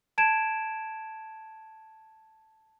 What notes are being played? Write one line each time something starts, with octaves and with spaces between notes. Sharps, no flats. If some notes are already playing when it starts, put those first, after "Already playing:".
A5 G#6 D7 E7